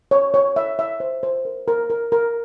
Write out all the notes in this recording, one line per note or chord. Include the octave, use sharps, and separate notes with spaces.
C#5
C#5
E5
E5
C5
C5
A#4
A#4
A#4
A#4